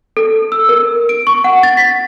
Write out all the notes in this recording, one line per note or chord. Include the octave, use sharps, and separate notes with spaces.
A4
E6
A#4
D7
C#6
F#5
A6
B6